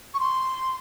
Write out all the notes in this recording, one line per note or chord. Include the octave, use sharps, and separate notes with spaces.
C#6
C6